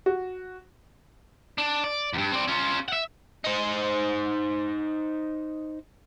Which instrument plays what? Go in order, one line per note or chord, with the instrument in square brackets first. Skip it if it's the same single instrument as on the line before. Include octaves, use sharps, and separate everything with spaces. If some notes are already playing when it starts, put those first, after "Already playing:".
[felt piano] F#4
[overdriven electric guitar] D4
D5
E2 G2
C4 D5
C#4 F4
E5 F#5
D#4 C5